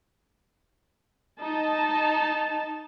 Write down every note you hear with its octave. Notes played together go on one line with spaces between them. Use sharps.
D#4 A5